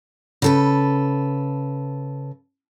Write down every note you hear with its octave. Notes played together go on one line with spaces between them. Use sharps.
C#3 A4 B4